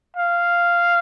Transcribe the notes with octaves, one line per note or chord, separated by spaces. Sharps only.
F5